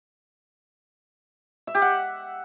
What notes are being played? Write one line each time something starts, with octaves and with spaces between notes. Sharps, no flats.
E5
G4
F#5